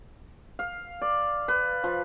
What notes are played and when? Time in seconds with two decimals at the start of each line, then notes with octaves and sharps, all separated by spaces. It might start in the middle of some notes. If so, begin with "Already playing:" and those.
0.59 F5
1.02 D5
1.48 B4
1.84 F3